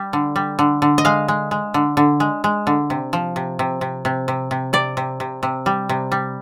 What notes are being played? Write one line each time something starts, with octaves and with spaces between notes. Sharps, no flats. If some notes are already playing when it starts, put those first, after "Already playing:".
Already playing: G3
D3
G3
D3
D3
D#5
G#3 F5
G#3
G#3
D3
D3
G#3
G#3
D3
C3
F3
C3
C3
C3
C3
C3
C3
C3 D5
C3
C3
C3
G3
C3
G3